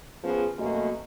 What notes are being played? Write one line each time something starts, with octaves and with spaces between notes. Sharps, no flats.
F3 B3 C#4 G#4
F#2 B2 A3 A#3 F#4 D#5